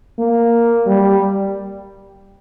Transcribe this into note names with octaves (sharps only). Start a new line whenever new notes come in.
A#3
G3